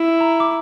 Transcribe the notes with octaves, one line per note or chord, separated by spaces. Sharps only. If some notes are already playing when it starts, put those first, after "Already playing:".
Already playing: E4
A#5
D6